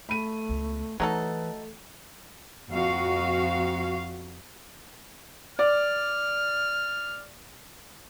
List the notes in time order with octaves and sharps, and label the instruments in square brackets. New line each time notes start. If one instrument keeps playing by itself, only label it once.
[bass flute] A3 [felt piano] B5 D#7
[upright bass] C#2 B3
[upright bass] E3 [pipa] F#3 D#4 A4 [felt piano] A3 [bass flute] B4
[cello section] F2 F#4 F5
[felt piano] D5 [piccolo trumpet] F6